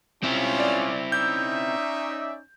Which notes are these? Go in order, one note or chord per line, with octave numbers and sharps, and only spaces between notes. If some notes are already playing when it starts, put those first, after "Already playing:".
C4 C#4 E4 F4
D5
C#4 D#4 D5 E5 G6